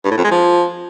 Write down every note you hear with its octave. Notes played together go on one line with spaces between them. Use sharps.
G2
A2
F2
G#3
F3